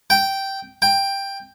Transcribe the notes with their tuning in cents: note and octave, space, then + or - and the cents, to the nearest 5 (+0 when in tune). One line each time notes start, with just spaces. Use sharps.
G5 -10
G5 +10